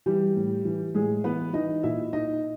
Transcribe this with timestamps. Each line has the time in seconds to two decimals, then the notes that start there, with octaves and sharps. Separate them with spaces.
0.06 E3 G3 G4
0.36 A2
0.65 E3
0.94 A2 G#3 G#4
1.24 E3 B3 B4
1.53 E3 D#4 D#5
1.83 A#2 E4 E5
2.12 A#2 D#4 D#5